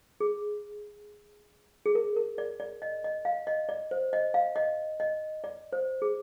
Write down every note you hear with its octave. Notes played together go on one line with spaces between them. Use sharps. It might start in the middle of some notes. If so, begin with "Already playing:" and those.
G#4
G#4
A#4
A#4
D5
D5
D#5
D#5
F5
D#5
D5
C5
D#5
F5
D#5
D#5
D5
C5
G#4